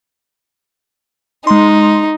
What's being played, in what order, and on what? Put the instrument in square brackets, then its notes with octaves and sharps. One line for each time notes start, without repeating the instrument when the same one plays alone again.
[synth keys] G#3 C6 [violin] D#4